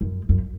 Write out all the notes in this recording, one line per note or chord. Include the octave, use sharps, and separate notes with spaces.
F#2
F#2